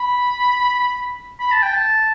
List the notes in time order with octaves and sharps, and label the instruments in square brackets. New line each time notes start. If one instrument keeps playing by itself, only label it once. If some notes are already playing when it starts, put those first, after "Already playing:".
Already playing: [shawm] B5
B5
A5
G5
A5